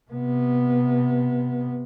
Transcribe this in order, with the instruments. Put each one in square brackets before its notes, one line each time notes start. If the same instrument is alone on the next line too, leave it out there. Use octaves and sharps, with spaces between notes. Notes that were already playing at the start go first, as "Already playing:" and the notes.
[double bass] C3 B3